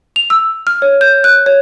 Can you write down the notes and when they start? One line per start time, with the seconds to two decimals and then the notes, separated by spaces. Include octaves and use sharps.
0.16 F7
0.30 E6
0.67 F6
0.82 C#5
1.01 G6
1.24 F#6
1.46 C#5